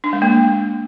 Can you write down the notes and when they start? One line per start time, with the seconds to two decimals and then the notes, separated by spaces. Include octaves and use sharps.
0.04 D4
0.13 G#3
0.22 A#3